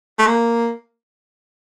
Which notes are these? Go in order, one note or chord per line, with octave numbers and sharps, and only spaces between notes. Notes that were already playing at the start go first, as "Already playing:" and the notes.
A3
A#3